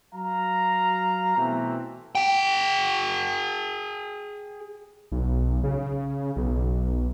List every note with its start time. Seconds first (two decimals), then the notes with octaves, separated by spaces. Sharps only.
0.15 F#3 F5 A#5
1.38 B2 E3 A3 C4
2.15 G#4 G5
5.12 B1
5.64 C#3
6.36 B1